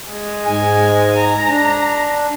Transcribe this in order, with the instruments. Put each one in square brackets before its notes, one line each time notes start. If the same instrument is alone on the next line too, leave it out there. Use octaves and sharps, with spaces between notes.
[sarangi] G#3
[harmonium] G#2 G#5
[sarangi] A#5
[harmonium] D4